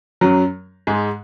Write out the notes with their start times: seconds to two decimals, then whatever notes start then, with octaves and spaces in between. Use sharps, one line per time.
0.21 F#2 F#3
0.87 G#2 G#3